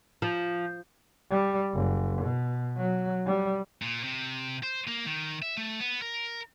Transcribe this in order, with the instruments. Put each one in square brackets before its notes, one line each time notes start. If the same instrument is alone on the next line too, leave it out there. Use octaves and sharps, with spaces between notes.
[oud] F3
[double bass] G3
F#1
B2
F#3
G3
[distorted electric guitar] A#2
C3
C5
A#3
D#3
E5
A3
B3
A#4